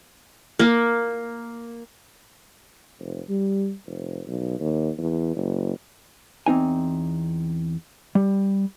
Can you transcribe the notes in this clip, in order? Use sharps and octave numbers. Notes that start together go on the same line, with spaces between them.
A#3
F1
G3
F1
B1
D#2
E2
F#1
E2 C4 D#4 G#5
G3